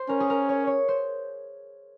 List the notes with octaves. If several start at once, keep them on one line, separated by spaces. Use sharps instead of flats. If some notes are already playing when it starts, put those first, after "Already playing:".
Already playing: C5
C#4 A#4
G#4
A#4
C#5
C#5
C5